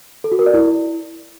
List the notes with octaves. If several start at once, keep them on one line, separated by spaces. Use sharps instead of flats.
A4
F#4
A#4
D5
E4